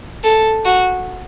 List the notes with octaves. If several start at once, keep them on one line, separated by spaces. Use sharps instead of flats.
A4
F#4